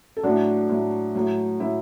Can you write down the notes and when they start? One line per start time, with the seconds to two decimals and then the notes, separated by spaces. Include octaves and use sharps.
0.17 A4
0.23 A2 F#3 D4 F#4
0.70 A2 F#3
1.15 A2 F#3
1.60 A2 F#3 E4